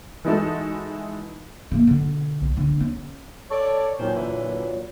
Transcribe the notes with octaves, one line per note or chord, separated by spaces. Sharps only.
E3 G#3 D#4 E4 F#4 A4
E3 A#3
B2 D3
B1
D3
C#4
A4 C#5 D5
A#2 D#3 F#3 C#4 C5
D3 E3 B4